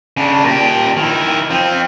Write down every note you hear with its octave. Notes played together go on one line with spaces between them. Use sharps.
C#3 D4
A#2 G4
D#3 E4
F3 C4